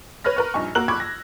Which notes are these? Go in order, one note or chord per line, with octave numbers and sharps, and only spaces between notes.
B4 C#5 B5 F6 A#6
A#4 B4 C#6
A#1 G2 D#4 G#5 C#6
A#3 F#4 A#4 E6 F#6 F#7
B1 B5 C#6 D6 G#6
A#6